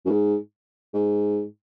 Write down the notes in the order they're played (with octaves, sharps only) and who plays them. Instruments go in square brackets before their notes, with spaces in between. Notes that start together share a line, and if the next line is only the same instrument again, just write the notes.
[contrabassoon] F#2
G#2
G#2